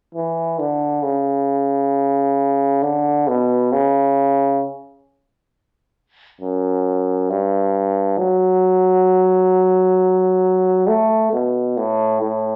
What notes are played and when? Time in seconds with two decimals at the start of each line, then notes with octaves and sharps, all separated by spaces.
0.15 E3
0.59 D3
1.03 C#3
2.83 D3
3.28 B2
3.73 C#3
6.41 F#2
7.30 G2
8.19 F#3
10.87 A3
11.33 B2
11.77 A2
12.22 A2